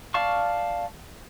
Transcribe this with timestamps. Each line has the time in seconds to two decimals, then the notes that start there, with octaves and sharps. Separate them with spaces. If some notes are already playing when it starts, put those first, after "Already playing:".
0.14 D5 F5 A5 C#6